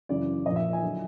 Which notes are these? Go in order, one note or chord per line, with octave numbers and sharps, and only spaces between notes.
F#2 C#3 E3 D5
A#1 A#2 F3 D#5
E5
G#5
D3 F#3